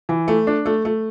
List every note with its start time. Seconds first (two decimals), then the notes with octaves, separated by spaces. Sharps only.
0.09 E3
0.28 A3
0.47 D4
0.66 A3
0.85 A3